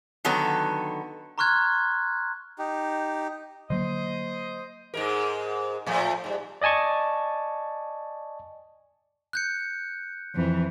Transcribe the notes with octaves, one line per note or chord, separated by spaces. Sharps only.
D3 D#3 F#3 B3 A4
A#5 C6 C#6 F6 F#6 G#6
D#4 G4
D3 F#3 A#3 C5 D#5
G#2 G#3 A#4
A2 F3 A3
G#2 G3
D5 D#5 G#5 A5 C#6
F#6 G6 C#7
F2 E3